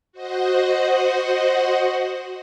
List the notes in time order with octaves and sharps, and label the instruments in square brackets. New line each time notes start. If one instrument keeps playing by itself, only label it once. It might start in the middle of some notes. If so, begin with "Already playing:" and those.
[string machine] F#4 C5 D#5 F#5